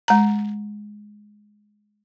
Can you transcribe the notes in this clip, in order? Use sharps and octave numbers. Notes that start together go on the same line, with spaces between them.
G#3 A#5